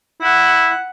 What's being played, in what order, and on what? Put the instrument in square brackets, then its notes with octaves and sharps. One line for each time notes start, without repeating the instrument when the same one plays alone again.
[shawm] E4 [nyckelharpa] F#5